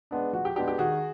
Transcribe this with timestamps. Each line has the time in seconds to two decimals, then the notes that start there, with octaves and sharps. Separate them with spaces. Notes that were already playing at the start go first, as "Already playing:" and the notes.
0.11 G#3 B3 D4
0.33 F3 F#4
0.45 G4
0.56 G#3 B3 D4 G4
0.68 G4
0.78 D#3 F#4 G#4